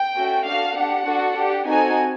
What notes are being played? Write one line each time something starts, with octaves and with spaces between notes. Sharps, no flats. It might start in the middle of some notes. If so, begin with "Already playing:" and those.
Already playing: G5
A3 C#4 F#4 A4
D4 F#4 A4 F5
D4 G4 F#5
D4 F#4 A4
D4 G4
C4 D#4 F#4 A4 G#5